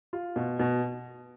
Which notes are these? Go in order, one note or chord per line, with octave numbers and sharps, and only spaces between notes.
F4
B2
B2